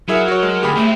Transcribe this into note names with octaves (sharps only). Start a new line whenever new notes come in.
F#3 E4 G#4 A#4 E5
F#4 C#5
G#3
D2 G4 G#4 B5
G#3 A3 C4